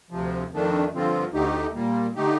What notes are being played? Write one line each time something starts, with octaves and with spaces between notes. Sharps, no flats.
D2 C3 F3
F2 D#3 A3 D4
G2 D3 F3 C4 F4
D2 D3 A3 D#4 G4
A#2 G3 A#3
D3 A3 D#4 G4